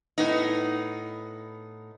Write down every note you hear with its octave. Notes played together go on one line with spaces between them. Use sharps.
A2 B3 D#4